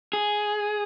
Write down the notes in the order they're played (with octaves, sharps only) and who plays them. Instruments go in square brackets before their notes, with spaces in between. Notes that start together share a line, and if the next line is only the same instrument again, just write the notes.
[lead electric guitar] G#4